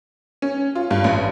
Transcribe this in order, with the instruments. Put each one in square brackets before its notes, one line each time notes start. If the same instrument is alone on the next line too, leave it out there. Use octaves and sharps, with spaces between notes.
[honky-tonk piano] C#4
F4
G2
A1